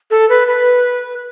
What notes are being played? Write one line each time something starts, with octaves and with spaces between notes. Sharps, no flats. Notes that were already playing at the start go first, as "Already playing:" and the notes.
A4
B4
B4